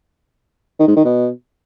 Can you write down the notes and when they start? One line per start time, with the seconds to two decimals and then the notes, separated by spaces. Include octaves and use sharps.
0.79 D#3
0.88 G#2
0.96 D#3
1.05 B2